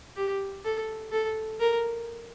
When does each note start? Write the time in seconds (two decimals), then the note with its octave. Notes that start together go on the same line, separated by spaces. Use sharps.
0.16 G4
0.65 A4
1.12 A4
1.60 A#4